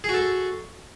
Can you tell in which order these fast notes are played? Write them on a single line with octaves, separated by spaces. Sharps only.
G#4 F#4 A4